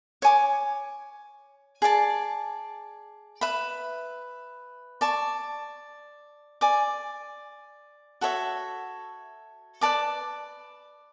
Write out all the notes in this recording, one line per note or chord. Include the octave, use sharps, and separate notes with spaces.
C#5 G#5 D6
G#4 D5 A5
B4 E5 B5
D5 A5 C#6
D5 G#5 D6
F#4 A4 C#5 E5
B4 D5 A5 D6